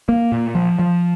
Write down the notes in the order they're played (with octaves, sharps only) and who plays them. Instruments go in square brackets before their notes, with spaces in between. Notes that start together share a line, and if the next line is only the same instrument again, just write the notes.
[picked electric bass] A#3
A#2
F3
F3